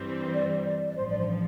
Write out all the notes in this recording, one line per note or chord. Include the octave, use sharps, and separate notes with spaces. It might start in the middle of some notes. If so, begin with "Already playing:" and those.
Already playing: G2 E3 G3 C4
C5
D5
D5
D5
A1 G2 F3 C5
D5
C5